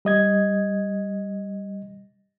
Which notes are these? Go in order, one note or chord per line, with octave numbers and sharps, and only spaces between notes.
G3 D#5 G#6